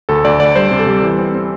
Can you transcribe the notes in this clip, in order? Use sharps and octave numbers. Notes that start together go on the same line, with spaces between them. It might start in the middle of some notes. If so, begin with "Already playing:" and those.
D2 A4
D2 D5
D2 D5
G3 C5
C3
A4
G3
E3
C4
C4